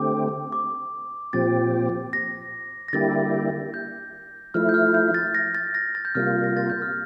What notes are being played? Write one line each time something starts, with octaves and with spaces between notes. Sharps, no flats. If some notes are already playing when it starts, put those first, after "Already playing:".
Already playing: D3 A3 C4 G4 D6
D6
A#2 F3 C4 G4 A6
A#6
A#6
D3 G3 A#3 E4 G4 A6
G6
F3 A3 E4 F6
G6
F6
G6
A6
A#6
A6
A#6
A6
G6
C3 G3 A#3 F4 F6
A#6
A6
G6
F6